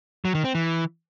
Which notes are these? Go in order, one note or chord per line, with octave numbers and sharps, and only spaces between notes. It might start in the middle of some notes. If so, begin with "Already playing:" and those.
F#3
D#3
C4
E3